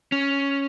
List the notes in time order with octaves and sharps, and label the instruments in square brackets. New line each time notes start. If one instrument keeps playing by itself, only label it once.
[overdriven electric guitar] C#4